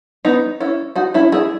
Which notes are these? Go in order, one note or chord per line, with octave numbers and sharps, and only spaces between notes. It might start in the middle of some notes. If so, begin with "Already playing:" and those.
B3 D#4
C#4 E4
D#4 F#4
C#4 E4
E4 G#4